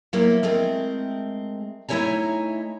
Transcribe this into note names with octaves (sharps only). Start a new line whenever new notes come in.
F3 F#3 A#3 B3 E4
G#3 A3 C4 A#4
A3 D#4 E4 C#5 G#5 A#5